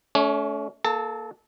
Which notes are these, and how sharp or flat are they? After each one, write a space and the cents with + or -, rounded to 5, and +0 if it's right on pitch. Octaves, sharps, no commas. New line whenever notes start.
A3 -25 C#4 +35 C#5 +0
A#3 +0 A4 -30 A5 +35